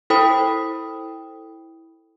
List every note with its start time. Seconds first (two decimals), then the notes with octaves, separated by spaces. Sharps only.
0.10 E4 A4 C5 G5 B5 D#6